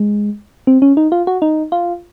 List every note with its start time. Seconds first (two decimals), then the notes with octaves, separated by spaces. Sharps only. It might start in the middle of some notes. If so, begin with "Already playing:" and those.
Already playing: G#3
0.67 C4
0.82 C#4
0.97 D#4
1.12 F4
1.27 F#4
1.42 D#4
1.72 F4